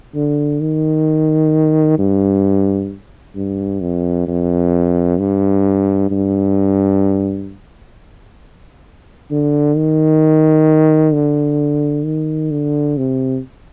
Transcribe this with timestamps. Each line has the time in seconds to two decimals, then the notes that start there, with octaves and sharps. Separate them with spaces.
0.15 D3
0.60 D#3
1.98 G2
3.35 G2
3.81 F2
4.27 F2
5.18 G2
6.11 G2
9.31 D3
9.76 D#3
11.13 D3
12.05 D#3
12.51 D3
12.97 C3